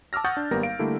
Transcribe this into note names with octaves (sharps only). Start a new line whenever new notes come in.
A5 D6 E6 F6 A#6
F#5 C#6 D#6 G6 A6
D4
G#1 G3 A#3 B3 A#4 A#6
F5 D7
D3 G3 A3 A#3 E4